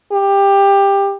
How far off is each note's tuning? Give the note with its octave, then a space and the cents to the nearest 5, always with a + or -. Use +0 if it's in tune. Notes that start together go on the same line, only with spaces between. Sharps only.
G4 +15